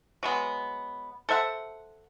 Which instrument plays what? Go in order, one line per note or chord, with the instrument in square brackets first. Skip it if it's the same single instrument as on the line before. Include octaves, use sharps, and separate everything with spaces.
[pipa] F#3 G#3 B3
A4 C5 E5 F#5